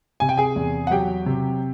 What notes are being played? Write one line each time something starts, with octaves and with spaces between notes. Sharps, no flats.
C3 G#5
G5
G#4 G#5
E2
F#5
F#3 G4 G5
C3